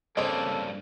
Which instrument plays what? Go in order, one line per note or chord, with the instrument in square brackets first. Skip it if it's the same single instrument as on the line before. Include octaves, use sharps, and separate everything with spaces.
[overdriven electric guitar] G2 A#3 [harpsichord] C#3 C4 C5 [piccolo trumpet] A4 [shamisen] C#5 D#5